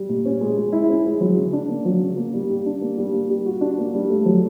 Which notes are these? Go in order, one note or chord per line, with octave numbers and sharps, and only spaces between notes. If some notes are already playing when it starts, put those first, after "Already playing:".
Already playing: G3
A#2
C#4
G#3
G#3
E4
C#4
G#3
F#3
C#3
D4
A#3
F#3
C#3
A#3
G3
G4
D4
A#3
G3
A#3
G3
F#4
D4
A#3
G3
A3
F#3